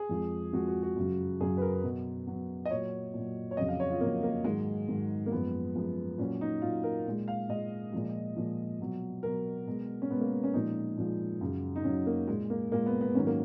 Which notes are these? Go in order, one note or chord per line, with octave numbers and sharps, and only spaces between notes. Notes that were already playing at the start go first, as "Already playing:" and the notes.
Already playing: G#4
F2 F3 G#3
F2 F3 G#3 F#4
F#4
F#4
F#2 C#3 F#3
F#2 C#3 F#3 G#4
B4
A#4
B2 F#3
B2 F#3
D#5
A#2 F#3 C#5
A#2
F#3
C#5
F2 C#3 F#3 D#5
F5
C#5
F4
F2 C#3 F#3 A#3
A#3
G#2 D#3 F#3 G#3
G#2 D#3 F#3
A#3
F#2 F3 G#3 B3
F#2 F3 G#3
A#2 F#3 C#4
D#4
A#2 F#3 F4
A#4
A#2 G#3
F5
A#2 G#3 D#5
A#2 F3 G#3
A#2 F3 G#3
B2 F#3
B2 F#3 A#4
B2 G#3
C#4
B2 G#3 B3
A#3
C#4
A#2 F3 G#3 D#4
A#2 F3 G#3
F#2 C#3 F#3
D#4
F#2 C#3 F#3 C#4
A#3
A#2 G#3
A#3
A#2 G#3 A#3
B3
B3
G#2 D#3 F#3 C#4
A#3